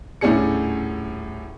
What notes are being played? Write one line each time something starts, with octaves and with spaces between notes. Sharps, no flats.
D#1 A2 C#4 D4 G#4 C#7